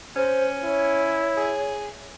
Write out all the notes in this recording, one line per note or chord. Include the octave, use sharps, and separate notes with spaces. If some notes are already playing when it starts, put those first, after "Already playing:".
C#4 C5
E4 C#5
G#4